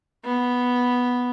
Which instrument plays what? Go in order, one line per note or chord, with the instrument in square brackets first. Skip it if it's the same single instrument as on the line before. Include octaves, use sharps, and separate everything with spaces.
[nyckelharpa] B3